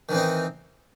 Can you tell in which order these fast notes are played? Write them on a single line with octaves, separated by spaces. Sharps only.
D#3 E3 C4 D#4